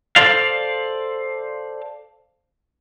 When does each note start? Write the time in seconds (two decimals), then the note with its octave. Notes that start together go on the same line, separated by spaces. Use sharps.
0.16 A4 C5 D5 F5